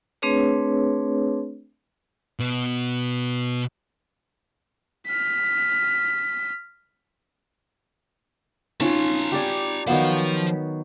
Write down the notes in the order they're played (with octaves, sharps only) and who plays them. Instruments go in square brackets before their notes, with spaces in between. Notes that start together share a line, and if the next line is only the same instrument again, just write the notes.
[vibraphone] A3 C4 D4 G#4 B4 C#5
[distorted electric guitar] B2 B3
[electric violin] F6 B6
[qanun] C#4 F4 C#5 [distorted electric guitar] D#4 A5
[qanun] G4 D5 G#5
[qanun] D#3 F#3 B3 [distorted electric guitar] F3 F5